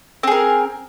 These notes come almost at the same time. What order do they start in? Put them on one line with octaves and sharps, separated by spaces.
C4 G#4 A#4